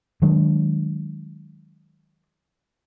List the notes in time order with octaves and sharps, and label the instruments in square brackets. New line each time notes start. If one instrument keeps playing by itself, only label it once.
[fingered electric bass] D#3 F#3 G#3 D4